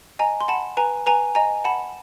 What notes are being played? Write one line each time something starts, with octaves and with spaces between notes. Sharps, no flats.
D#5 G#5 A#5
C6
F#5 A5 B5
B4 G#5 A#5
B4 G#5 A#5
D#5 G#5 A#5
F#5 A5 B5